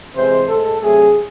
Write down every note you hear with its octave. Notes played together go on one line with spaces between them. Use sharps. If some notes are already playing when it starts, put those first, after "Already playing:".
C3 E3 G#3 C5
A2 G#3 A4
C3 F#3 A3 G#4